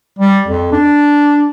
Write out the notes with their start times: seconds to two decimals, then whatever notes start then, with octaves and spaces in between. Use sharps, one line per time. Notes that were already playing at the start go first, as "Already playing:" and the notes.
0.19 G3
0.48 F2
0.72 D4